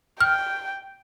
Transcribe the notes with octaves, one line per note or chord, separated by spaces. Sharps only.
G5 F6